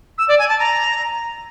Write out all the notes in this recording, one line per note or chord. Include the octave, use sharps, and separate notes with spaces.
E6
D5
G#5
A5
A#5